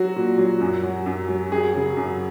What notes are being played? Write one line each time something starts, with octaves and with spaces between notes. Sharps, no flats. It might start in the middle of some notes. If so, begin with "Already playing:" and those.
Already playing: F#3 F#4
A#2
F#3
F#2
F#3
F#2
F#3
F#2 G#4
C#3 F#3
F#2